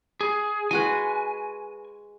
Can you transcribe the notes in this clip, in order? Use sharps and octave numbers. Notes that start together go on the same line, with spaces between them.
G#4
G#3 F#4 B4 G#5